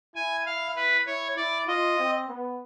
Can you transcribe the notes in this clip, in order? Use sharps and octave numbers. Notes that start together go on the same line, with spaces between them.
E4 G#5
F5
B4
E4 C#5
E4 D5
F4 D#5
C4
B3